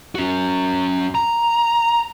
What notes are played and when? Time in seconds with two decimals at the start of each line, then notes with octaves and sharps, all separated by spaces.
0.15 C#4 F#4
1.15 A#5